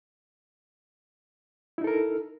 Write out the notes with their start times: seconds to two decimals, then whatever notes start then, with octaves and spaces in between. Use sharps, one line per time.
1.78 E4
1.81 D#4
1.84 A4
1.87 A#4